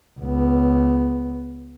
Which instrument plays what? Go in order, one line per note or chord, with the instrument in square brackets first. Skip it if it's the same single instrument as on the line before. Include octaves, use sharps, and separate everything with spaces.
[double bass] C#2 B3